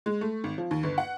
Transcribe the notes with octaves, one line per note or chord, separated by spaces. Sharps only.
G#3
A3
G#1
F3
D#2
G1
F#5